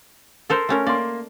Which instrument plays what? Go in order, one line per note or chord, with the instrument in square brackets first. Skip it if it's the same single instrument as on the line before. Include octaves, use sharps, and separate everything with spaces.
[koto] A4 A#4 C5
A3 C#4 A#4
[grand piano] A#3 C6 [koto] D5